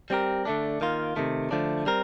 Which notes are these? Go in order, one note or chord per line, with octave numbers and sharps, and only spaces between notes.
G3 C4 G4 A#4
D3 A3 D4
D#3 A#3 F4
C3 D#3 A3
D3 F3 A3 D4
G3 C4 A#4